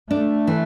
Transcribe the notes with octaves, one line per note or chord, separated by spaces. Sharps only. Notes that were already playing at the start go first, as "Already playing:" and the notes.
A3 D4
E3